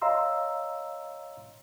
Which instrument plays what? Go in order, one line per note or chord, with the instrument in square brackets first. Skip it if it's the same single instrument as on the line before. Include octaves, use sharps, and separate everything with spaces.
[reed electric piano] C#5 D#5 F5 A#5 C6 E6